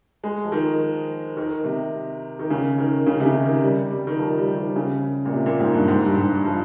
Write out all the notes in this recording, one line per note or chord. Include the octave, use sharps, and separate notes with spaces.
G#3
F3
D#3
D#3
C3
D#3
C#3
D#3
C#3
C3
C#3
D#3
G3
G3
D#3
F3
G3
D#3
C#3
A#2
C3
A#2
G#2
G2
G#2
G2
G#2
F3